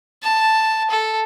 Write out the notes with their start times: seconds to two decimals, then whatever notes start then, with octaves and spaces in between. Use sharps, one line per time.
0.23 A5
0.91 A4